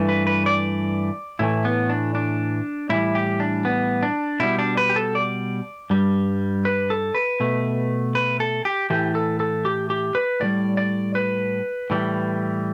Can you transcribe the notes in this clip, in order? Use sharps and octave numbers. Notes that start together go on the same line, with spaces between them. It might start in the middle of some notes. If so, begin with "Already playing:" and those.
Already playing: G2 E3 A3
B4
B4
D5
A2 E3 A3 E4
B3
D4
D4
A2 E3 G3 E4
G4
D4
B3
D4
B2 G3 E4
D4
B4
G4
A4
D5
G2 G3
B4
A4
B4
B2 A3
B4
A4
G4
A2 E3 A3 G4
A4
A4
G4
G4
B4
A2 E3 G3 D5
D5
B4
A2 E3 G3